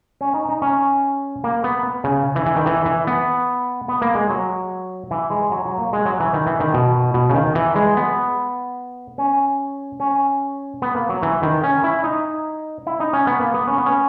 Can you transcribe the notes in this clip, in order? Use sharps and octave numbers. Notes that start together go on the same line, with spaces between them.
C#4
D#4
D#4
C#4
A#3
B3
C#3
E3
E3
D#3
E3
E3
B3
B3
A#3
G#3
F#3
E3
G#3
F#3
F#3
A#3
G#3
F#3
E3
D#3
E3
D#3
B2
B2
C#3
D#3
E3
G#3
B3
C#4
C#4
B3
A#3
F#3
E3
D#3
C#4
E4
D#4
E4
D#4
C#4
B3
A#3
B3
C#4
B3
C#4